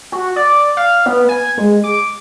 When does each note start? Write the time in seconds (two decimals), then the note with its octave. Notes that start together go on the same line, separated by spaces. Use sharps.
0.12 F#4
0.36 D5
0.77 F5
1.06 B3
1.29 G#5
1.58 G#3
1.84 D6